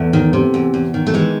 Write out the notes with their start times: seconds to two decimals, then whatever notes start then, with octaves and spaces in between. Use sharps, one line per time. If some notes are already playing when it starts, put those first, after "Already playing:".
Already playing: E2 A3
0.13 D#3
0.33 C3
0.54 E2
0.74 E2
0.94 D#3
1.07 A3
1.14 E3 G#3